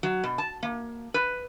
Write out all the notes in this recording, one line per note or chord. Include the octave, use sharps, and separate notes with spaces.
F#3
B2
A5
A#3
B4